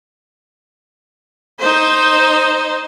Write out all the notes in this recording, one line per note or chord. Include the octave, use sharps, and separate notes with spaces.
D#4 C5